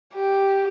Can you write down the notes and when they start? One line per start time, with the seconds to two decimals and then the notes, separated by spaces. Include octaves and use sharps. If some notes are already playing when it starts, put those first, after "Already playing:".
0.15 G4